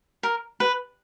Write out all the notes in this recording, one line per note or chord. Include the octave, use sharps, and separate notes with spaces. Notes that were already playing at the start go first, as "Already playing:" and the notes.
A#4
B4